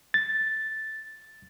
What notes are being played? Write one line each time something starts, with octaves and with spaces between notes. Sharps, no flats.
A6